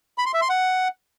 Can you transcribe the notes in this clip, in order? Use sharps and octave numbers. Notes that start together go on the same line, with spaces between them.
B5
C6
E5
C6
F#5